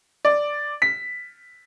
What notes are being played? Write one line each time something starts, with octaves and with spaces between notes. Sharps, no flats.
D5
B6